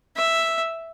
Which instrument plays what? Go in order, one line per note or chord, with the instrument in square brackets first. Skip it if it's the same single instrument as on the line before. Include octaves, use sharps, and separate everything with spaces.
[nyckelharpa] E5